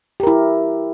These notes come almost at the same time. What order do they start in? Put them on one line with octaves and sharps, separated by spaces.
G4 A#4 E4